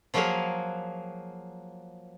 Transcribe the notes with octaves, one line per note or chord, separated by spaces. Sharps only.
F3 F#3 A#3 F#4 G#4 A#4